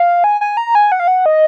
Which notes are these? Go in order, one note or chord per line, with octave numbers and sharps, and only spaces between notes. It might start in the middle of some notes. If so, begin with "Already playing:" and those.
Already playing: F5
G#5
G#5
A#5
G#5
F#5
F5
F#5
D#5